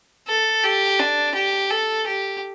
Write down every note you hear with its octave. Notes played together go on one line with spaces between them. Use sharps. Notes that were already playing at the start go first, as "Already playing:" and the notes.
A4
G4
D4
G4
A4
G4